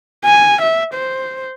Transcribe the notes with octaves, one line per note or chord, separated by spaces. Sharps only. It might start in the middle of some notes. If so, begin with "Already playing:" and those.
G#5
E5
C5